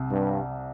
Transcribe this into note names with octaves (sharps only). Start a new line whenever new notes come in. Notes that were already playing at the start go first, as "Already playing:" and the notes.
Already playing: C2 C3
G2